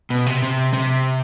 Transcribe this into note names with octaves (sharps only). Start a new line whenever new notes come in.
B2
C3
C3
C3